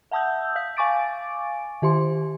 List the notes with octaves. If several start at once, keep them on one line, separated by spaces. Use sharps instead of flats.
E5 F#5 A5 D#6 E6 G6
F5 G6 B6
F5 G#5 C#6 D6 A6 D7
D#3 G4 C5 C6